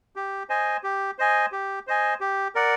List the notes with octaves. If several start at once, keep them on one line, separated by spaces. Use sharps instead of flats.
G4
C5 D#5 G#5
G4
C5 D#5 G#5
G4
C5 D#5 G#5
G4
A#4 D5 F#5